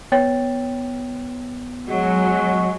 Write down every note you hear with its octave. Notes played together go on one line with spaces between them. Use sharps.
B3 C#5 G5 A6
F#3 G#3 F#4